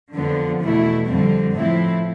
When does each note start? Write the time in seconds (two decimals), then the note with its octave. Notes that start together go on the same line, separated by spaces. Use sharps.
0.14 F2 D3 F3 B3
0.60 E2 B2 A3 E4
1.07 F2 D3 G3 C4
1.54 A2 F3 C4 E4